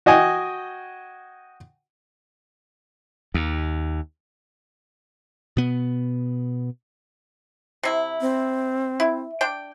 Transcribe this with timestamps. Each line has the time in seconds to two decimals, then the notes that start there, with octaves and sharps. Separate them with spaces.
0.06 F#4 D#5 G5 G#5
3.34 D#2
5.57 B2 B3
7.83 C3 E4
8.21 C4
9.00 E4
9.41 D4 G5